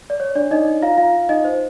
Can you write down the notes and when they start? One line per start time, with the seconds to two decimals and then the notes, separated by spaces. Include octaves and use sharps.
0.10 D5
0.20 C#5
0.35 D4 D5
0.51 D#4 D#5
0.82 F4 F5
0.98 F4 F5
1.29 D#4 D#5
1.44 C5